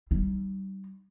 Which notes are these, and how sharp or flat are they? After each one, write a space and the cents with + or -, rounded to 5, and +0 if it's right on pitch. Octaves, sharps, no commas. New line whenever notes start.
G3 -25 D#4 -25